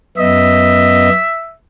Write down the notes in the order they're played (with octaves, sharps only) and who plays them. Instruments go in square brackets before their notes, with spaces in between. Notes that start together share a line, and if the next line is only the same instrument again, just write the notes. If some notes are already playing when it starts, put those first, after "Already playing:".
[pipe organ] F#2 B3 D#5 [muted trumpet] E5